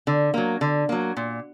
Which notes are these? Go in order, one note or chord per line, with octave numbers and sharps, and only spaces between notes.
D3
F#3 A#3
D3
F#3 A#3
A#2